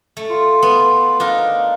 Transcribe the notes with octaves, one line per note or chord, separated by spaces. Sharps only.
A3
F4
B3
D4 D#4 A#4 F5